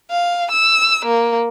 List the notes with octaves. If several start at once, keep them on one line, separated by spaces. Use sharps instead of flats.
F5
E6
A#3